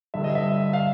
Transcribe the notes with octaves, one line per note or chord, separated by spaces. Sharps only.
G1 G2 D3 E5
D#5
E5
F5